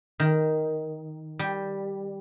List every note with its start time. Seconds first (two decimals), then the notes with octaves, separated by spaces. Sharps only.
0.20 D#3
1.39 G3